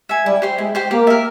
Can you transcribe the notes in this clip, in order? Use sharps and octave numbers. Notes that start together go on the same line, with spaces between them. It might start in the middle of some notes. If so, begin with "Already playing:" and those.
E5 G#5
G3 E4
G4 C5 G5
G#3 E4
G4 C5 G5
A#3 G4
A#4 E5